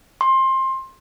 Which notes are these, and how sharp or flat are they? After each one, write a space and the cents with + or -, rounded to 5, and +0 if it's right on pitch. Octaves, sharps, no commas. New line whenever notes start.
C6 +20